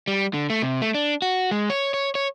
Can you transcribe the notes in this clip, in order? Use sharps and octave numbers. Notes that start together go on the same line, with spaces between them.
G3
D3
A3
C3
A3
D4
F#4
G#3
C#5
C#5
C#5